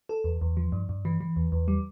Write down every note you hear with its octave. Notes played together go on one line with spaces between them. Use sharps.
A4
E2
E2
F3
G2
G2
E3
E3
E2
E2
G3